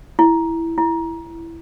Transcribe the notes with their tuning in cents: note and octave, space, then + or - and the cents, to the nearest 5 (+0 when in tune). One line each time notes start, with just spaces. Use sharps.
E4 +0
E4 +10